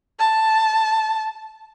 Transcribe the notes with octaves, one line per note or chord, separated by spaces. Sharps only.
A5